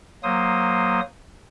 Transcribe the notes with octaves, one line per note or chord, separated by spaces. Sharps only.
F#3 A#3 C5 D#6